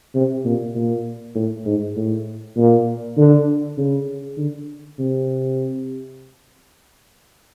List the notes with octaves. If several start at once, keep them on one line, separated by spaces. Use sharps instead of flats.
C3
A#2
A#2
A2
G#2
A2
A#2
D3
C#3
D3
C3